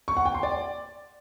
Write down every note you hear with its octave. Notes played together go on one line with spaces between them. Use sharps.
C#6
F#5
G5
C6
D5